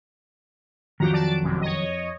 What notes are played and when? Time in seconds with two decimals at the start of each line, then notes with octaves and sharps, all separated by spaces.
1.00 F2 D#3 F3 F#3 F#4 G4 A#5
1.13 D5 A5 D7
1.42 A1 F#2 C3
1.61 C#5 D#5